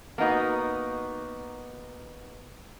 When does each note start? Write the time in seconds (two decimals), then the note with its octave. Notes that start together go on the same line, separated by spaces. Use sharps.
0.18 A#3 B3 D#4 F#4